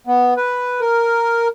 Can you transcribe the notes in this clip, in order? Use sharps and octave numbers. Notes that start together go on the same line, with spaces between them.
B3
B4
A#4